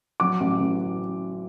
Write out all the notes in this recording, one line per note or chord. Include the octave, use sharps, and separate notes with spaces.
F#3 D6
A1
A1